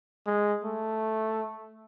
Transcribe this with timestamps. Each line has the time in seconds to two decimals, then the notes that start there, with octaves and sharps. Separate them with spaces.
0.26 G#3
0.64 A3